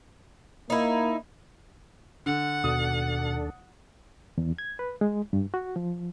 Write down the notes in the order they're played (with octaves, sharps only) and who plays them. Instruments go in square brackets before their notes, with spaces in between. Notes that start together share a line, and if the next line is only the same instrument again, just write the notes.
[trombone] A#3 [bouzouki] D#4 E4
[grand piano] D3 [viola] F#5
[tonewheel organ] D#2 D4 A4 [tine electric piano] B2 [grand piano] D#6
[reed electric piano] E2
G#6
B4
G#3
G2
F#4
F3